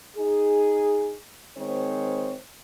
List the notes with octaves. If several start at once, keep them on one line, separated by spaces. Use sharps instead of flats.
D#4 G#4
D#3 G#3 C4 C5 C#5